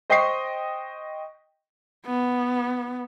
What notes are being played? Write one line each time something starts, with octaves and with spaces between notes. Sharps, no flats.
C5 D#5 G5 C#6 B6 C7
B3